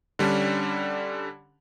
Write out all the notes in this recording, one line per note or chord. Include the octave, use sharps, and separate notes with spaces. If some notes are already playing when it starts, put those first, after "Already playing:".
D3 G3 C#4 D4